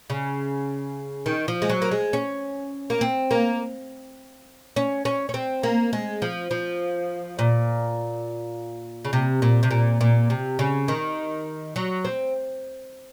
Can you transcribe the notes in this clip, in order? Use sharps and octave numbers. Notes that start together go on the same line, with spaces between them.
C#3
D#3
F3
G#3
F#3
A#3
G#3
C#4
A#3
C4
A#3
C#4
C#4
C#4
C4
A#3
G#3
F3
F3
A#2
C#3
C3
A#2
C3
A#2
A#2
C3
C#3
D#3
F#3
C4